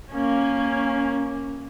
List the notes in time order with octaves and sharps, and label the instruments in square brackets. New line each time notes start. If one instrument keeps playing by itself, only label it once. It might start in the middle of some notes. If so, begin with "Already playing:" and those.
[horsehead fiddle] A#3 C#4